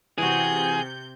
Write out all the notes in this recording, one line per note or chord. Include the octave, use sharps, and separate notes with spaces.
C3 E3 F#4 G#4 G6